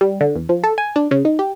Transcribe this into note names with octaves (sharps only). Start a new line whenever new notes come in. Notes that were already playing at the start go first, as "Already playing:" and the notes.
G3
D3
E2
F3
A4
G#5
D4
C#3
D#4
G4